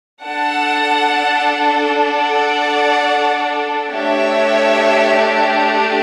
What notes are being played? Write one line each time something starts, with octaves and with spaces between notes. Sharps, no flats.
D4 A4 F#5 A5
D5 F#5
A3 D4 G4 C#5 E5